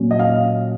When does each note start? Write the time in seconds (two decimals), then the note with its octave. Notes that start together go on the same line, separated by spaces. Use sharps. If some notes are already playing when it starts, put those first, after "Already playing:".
Already playing: A#2 F#3 C#4
0.11 D#5
0.19 F5